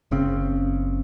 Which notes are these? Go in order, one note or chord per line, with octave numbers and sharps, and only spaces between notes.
F#1 C#3 C4